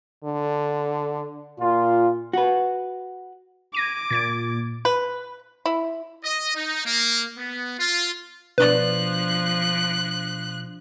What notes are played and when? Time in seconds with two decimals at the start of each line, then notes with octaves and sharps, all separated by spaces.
0.25 D3
1.60 A#2 F4
2.33 F#4 B4
3.74 D6 G#6 A#6 D#7
4.10 A#2 G#6 A6 D7
4.85 B4
5.66 E4
6.24 D#5
6.55 D#4
6.86 A#3
7.38 B3
7.79 F4
8.58 B2 F3 D4 B4 D5 F#6